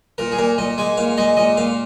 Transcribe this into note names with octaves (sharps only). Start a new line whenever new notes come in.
A#2 A#4
G#4
A#2 A#4
A#2 D#5
G#3 G#5
A#2 F5
G#3 D#5
A#2 D#5
A#2 F5